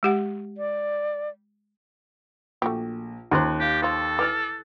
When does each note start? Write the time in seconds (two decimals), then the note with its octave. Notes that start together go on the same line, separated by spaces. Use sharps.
0.03 G#3 G4 F#5
0.57 D5
2.62 A#1 A3 F#4 G4
3.31 D#2 C#4 F4 C5 A#5 F#6
3.60 G4 F5
3.82 F3 F4 A4
4.19 E3 D6 F6 A6